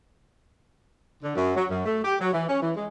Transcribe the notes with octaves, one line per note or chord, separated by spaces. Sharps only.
D3
F#2
F#3
F#2
A3
G4
F#3
E3
C#4
E3
G#3